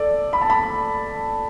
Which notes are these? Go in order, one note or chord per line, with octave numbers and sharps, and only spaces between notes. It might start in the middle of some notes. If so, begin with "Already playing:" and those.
Already playing: A4 D5
B5
A5
B5